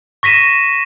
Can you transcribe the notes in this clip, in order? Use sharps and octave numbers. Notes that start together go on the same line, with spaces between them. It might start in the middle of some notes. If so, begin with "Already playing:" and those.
C#6 A#6 B6 D#7 E7